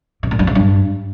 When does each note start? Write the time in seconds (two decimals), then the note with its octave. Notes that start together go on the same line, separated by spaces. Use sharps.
0.23 C3
0.31 A#2
0.39 G2
0.47 C3
0.55 G2